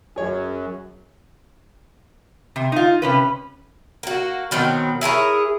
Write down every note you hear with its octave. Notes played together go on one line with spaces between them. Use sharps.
F#2 G#4 C#5
C3
D#4 F4
C3 C#4 B4
A#3 F#4
B2 D#3 F#3 C4
E4 G#4 A#4 C#5